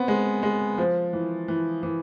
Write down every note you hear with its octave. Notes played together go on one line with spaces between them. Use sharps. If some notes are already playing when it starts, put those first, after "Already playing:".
Already playing: B3 C4
G#3
G#3
F3
E3
E3
E3